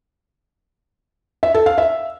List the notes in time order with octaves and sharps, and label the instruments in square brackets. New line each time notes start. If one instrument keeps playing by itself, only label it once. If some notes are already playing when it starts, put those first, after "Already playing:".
[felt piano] E5
A4
F5
E5